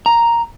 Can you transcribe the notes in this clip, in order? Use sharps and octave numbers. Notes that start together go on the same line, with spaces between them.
A#5